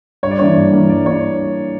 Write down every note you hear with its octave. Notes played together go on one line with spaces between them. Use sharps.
G2 C#5
D5
E3 A#3 D4 C#5
G2
E3 A#3 D4
G2 D5
A#3 D4 C#5